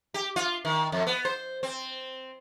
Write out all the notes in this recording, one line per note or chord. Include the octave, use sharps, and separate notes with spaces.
G4
F4
D#3
F2
B3
C5
C4